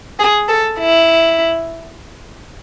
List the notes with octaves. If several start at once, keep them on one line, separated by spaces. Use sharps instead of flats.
G#4
A4
E4